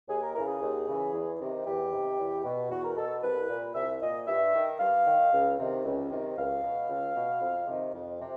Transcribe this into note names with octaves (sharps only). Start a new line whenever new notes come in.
D#2 G#4
A#4
C#3 E3 A#4
G#4
D#2
C#3 E3
E2
C3 D#3
E2 G4
C3 D#3
E2
B2
E2 F#4
A#4
B2 A4
C2 B4
A#2
C2 E5
A#2 D#5
G2 E5
D#3
G2 F5
D#3
C#2
C3 D#3
C#2
C3 D#3
C#2 F5
B2
C#2
B2
F2
C3 D#3
F2
C3